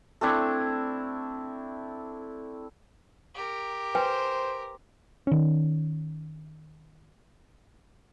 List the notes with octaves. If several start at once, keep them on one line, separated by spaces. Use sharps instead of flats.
A3 C4 D4 E4
G4 A#4
B4 C5 G5 G#5
D#3 C#4